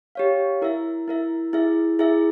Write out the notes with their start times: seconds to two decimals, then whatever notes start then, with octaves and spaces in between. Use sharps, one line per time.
0.15 G4 C#5 F5
0.62 E4 A#4 E5
1.08 E4 A#4 E5
1.53 E4 G#4 E5
1.99 E4 G#4 E5